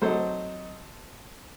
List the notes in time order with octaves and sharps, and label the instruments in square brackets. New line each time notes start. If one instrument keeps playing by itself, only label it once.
[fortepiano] F#3 C4 D#4 A4 C5